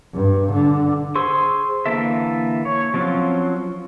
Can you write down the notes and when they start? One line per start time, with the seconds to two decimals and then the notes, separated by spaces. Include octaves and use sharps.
0.14 G2
0.52 D3
1.15 G#4 C5 C6 C#6 E6
1.86 D3 E3 A#3 A4 E5
2.65 C#5
2.94 F3 F#3 C4 C#4 F4